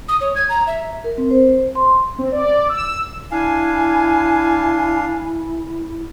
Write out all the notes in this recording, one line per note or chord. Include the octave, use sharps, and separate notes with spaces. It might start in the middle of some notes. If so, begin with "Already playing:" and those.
D#6
C#5
G#6
A#5
E5
A#4
C4
C5
C6
C4
D5
E6
D4 E4 F5 G#5